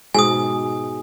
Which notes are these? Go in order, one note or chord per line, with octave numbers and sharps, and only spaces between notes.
G#2 B2 G#5 D#6